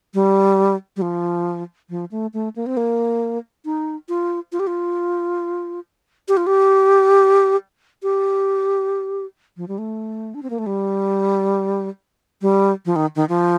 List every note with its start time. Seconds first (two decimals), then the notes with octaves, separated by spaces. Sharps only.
0.14 G3
0.96 G3
1.02 F3
1.90 F3
2.11 A3
2.34 A3
2.56 A#3
2.66 C4
2.77 A#3
3.65 D#4
4.09 F4
4.52 F4
4.60 G4
4.67 F4
6.28 G4
6.37 F4
6.47 G4
8.03 G4
9.57 F3
9.68 G3
9.78 A3
10.35 D4
10.43 C4
10.50 A#3
10.59 A3
10.66 G3
12.42 G3
12.86 F3
12.96 D#3
13.16 D#3
13.29 F3